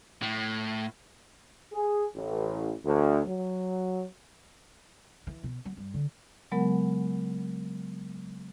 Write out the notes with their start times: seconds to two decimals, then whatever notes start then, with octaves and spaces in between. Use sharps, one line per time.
0.22 A2
1.72 G#4
2.14 A1
2.84 D2
3.26 F#3
5.27 E3
5.43 B2
5.65 F#3
5.77 G2
5.94 D3
6.51 C#3 F#3 G#3 B3 A#4 F#5